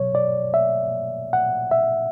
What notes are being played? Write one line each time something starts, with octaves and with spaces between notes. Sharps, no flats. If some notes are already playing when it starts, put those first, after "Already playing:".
Already playing: B2 F#3 C#5
D5
E5
F#5
E5